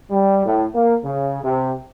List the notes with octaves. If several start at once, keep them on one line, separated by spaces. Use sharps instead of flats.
G3
A2
A#3
C#3
C3